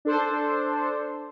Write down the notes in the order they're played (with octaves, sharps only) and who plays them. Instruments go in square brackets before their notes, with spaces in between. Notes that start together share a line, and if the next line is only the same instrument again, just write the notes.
[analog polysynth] D4 A4 C5